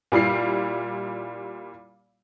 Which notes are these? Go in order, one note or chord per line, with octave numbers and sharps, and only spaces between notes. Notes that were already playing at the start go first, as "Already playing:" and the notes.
A#2 G3 E4 C7